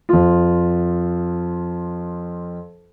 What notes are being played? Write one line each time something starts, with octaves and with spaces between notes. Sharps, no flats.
F2 F4